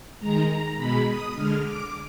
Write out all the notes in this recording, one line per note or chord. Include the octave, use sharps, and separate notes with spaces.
D#3 G#3 A#5
A#5
B2 G#3 B5
D#6
D3 G#3 F6
D6